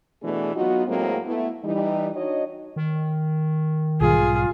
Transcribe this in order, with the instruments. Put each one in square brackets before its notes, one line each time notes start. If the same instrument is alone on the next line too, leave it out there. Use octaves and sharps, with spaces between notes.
[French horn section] B2 E3 A3 B3 D4 G#4
F#3 B3 D#4 F4 F#4
A2 F#3 G#3 A#3 C4
A3 B3 E4
E3 G3 D#4
D4 D#4 F#4 C#5 D#5
[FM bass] D#3
[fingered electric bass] B1 G#2 G3 [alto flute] F4 [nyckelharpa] G#4